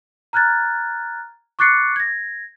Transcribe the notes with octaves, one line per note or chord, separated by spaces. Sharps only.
A#5 F6 F#6 G#6 A6
C#6 D6 F#6 A6 C7 C#7
G#6 A#6